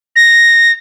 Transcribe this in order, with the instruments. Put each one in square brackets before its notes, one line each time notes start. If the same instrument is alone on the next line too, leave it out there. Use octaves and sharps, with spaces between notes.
[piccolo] A#6